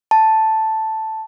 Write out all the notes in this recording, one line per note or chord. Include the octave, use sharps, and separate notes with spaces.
A5